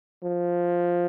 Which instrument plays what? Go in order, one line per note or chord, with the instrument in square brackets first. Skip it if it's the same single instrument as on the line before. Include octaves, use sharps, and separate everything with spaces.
[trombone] F3